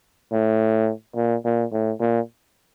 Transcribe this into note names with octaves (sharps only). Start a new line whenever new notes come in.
A2
A#2
A#2
A2
A#2